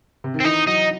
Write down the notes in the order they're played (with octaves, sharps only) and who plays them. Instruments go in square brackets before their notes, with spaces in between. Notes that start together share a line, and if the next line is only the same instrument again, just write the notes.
[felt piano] C3
D#3
[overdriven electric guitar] C4
[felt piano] E3 [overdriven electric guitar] D#4
[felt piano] F#3 [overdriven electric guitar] D#4